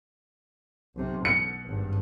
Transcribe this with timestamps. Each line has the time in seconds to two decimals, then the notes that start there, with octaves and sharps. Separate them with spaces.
0.96 B1 C3
1.25 B2 C#7
1.67 G#1 G2